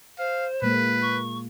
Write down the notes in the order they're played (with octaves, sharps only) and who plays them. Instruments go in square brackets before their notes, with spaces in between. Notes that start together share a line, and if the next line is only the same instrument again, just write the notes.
[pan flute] C5 [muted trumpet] F5
[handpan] A#2 G#3 A#3 [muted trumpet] B4
[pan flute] C#6